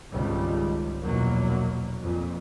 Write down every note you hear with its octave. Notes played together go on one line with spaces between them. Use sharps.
G#1 C#2 G3
A#1 E2 B2 F#3 A#3
F2 A#2